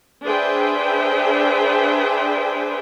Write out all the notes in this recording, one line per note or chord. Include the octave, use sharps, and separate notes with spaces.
D4 G#4 B4 C5 E5 G5